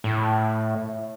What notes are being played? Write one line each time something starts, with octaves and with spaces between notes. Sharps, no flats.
A2